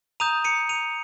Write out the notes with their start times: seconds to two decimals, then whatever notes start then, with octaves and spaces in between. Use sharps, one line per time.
0.20 A#5 D#6 G6 D#7 F7
0.44 C#7 D#7
0.69 D#7 F7